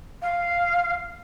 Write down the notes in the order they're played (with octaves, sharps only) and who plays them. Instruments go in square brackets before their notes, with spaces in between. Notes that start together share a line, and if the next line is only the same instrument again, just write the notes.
[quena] F5